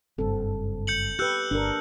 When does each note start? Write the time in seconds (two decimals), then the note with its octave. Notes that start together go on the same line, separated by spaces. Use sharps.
0.18 F#1 G2 C4 A4
0.87 G6 C#7 F#7
1.19 G4 B4 E6 F#6 G6
1.51 G1 D4 A#4